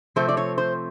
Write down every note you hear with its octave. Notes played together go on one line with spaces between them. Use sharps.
C3 F3 A3 C4 C5
D5
C#5
C5